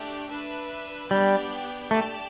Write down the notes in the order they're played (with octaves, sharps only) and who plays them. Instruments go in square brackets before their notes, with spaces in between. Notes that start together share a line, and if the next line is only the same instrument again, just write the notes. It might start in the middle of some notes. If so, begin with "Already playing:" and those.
Already playing: [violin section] A3 D4 G4 D5
D4 B4 E5
[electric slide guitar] G3 [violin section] B3 D4 G4 D5 G5
[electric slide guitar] A3 [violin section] G4 D5 A5